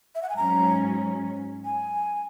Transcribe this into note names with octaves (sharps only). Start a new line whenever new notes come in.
E5
F#5
G#5
G#2 F#3 C#4 A#5
G#5